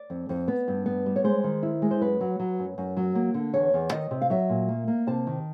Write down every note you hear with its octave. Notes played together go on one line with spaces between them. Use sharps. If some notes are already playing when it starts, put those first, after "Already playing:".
Already playing: D5
F2
F2
B3
G2
B3
G3
C#5
G#3 C5
D#3
E4
G#3
C5
F#2 B4
F#3
F#3
F#2
F#2
F#3
A#3
D3
E2 C#5
E2
D#3 D#5
C3
F5
F#3 E5
A#2
A#3
A#3
C3 A5
D#3